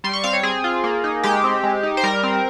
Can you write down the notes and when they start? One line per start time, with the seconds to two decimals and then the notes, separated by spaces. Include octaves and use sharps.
0.04 G3 C6
0.13 C#6
0.24 C4 F5
0.33 C#5
0.43 C4 G#4
0.64 F4
0.84 A#3
1.04 D#4
1.23 G#3 G4
1.44 C4
1.63 G#3
1.83 D#4
1.97 C5
2.03 G3 A#4
2.23 C4